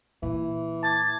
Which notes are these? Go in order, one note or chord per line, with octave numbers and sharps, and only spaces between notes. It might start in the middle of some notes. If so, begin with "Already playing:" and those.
A#2 E3
A5 D6 G#6 A6